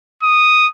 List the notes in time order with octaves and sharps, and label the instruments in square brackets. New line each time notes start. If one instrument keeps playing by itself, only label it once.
[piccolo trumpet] D#6